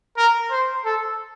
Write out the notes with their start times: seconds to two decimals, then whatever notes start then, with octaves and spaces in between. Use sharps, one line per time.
0.17 A#4
0.51 C5
0.85 A4